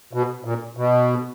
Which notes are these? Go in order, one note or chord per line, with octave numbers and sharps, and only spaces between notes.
B2
A#2
B2